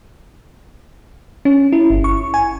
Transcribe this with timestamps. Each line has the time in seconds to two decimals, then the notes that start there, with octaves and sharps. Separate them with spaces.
1.45 C#4
1.72 E4
1.90 G1
2.04 C#6
2.34 G#5